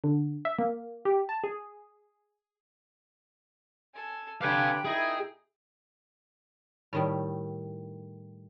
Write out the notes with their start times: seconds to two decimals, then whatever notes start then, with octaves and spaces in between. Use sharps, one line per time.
0.04 D3
0.45 E5
0.59 A#3
1.05 G4
1.29 A5
1.44 G#4
3.94 A4 G#5
4.41 D3 G4 B4 F5 G5 G#5
4.85 A#2 D#4 E4 G#4
6.93 A2 D#3 G3